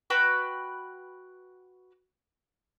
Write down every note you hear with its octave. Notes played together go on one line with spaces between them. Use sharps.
F#4 B4 G5 B5